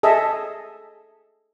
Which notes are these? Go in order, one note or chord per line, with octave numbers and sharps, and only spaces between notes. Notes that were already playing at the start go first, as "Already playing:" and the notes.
G#4 A4 D#5 E5